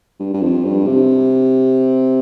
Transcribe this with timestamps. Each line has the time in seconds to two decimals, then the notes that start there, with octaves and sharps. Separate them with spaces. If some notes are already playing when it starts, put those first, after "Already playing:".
0.19 G2
0.33 G2
0.41 F2
0.65 G2
0.87 C3